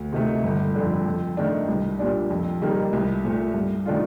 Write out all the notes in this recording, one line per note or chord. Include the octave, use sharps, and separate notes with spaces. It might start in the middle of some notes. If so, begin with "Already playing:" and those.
Already playing: D2
C3 D#3 A3
G1
F2 D3
F2
D#3 A3 D4
C2
A#2 G3 D4
F2
D#3 G3 A#3 D#4
C2
A#2 A3
G2
D#3 A3 D4 F4